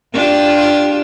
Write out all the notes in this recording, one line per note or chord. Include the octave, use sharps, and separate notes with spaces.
D4 F4 G4